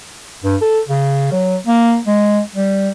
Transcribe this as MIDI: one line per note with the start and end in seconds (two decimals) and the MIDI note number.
0.44 0.56 43
0.61 0.80 69
0.88 1.29 49
1.32 1.56 54
1.67 1.98 58
2.07 2.41 56
2.55 2.91 55